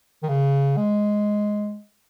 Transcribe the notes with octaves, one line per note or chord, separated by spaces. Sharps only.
D#3
C#3
G#3